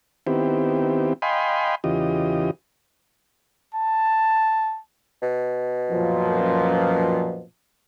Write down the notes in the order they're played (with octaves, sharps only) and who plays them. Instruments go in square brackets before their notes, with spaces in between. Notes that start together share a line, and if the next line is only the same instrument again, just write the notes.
[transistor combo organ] D#3 B3 C4 E4 G4
D#5 F5 G5 G#5 B5 C6
E2 C#3 E3 F4 G4 D#5
[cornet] A5
[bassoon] B2
[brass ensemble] F#2 A#2 F3